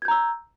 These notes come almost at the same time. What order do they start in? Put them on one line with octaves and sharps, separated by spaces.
G#6 G6 A#5 E6